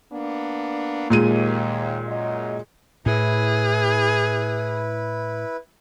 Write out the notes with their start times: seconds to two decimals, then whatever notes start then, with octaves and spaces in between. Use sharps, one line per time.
0.10 A#3 B3 D4
1.10 D#2 A#2 G#3 D#7
2.06 F#2 D#5
3.06 A2 E4 G#4 B4